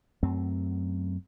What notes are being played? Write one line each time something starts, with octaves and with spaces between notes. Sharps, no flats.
F#2 F#3 A3 C4